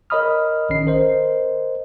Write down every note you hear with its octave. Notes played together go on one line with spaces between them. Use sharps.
A#4 C#5 D#5 B5 D#6 F6
A#1 D#3 C#4 C7
A#4 C5 D#5